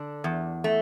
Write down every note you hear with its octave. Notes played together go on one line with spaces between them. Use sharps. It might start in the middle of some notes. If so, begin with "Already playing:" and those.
Already playing: D3 D4
E2
A3